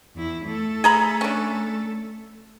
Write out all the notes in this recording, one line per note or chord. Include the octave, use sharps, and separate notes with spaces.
E2 E4
A3 A4
G#4 A#5 B5
C#4 D4